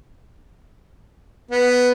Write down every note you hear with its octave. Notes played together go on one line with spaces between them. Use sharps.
B3